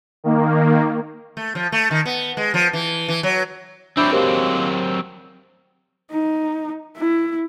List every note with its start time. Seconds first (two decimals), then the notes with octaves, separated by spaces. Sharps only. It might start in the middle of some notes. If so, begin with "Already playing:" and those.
0.24 D#3 A#3
1.37 A3
1.55 F3
1.72 A3
1.91 D#3
2.05 B3
2.37 G#3
2.54 F3
2.73 E3
3.08 E3
3.23 F#3
3.97 F#3 C4 D4 E4 D5 E5 E6 G6
4.13 G#3 A#3 G4 A#4 C5
6.12 D#4
6.97 E4